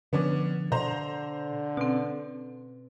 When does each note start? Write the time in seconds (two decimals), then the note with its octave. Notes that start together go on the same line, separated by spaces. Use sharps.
0.13 D3 F3 B3 C#4 D4
0.72 B2 D3 C5 A#5
1.77 B2 C4 C#4